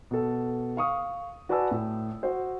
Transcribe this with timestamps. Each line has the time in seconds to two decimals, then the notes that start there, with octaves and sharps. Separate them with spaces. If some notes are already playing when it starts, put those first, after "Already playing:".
0.11 B2 A4
0.77 F5 C#6 D#6
1.49 F#4 B4 D5 G#5 A5 E6
1.71 A2
2.23 F#4 C5